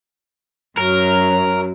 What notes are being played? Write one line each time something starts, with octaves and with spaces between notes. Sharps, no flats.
F#2 F#3 A#4